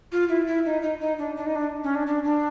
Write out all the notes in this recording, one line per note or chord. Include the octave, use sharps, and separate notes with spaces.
F4
E4
E4
D#4
D#4
D#4
D4
D4
D#4
D4
C#4
D4
D4
D4